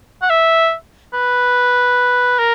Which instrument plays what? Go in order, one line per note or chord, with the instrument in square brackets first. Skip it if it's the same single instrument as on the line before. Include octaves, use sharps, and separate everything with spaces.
[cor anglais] F#5
E5
B4
A#4